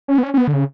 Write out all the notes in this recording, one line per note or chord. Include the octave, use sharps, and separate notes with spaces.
C#4
B3
C#4
C#4
B3
D3
C#3